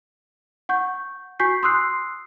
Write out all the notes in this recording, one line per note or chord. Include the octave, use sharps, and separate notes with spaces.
F#5 C#6 G6
F#4 G#5 C#6 G6 B6 C7
C6 D#6 E6 F#6 C7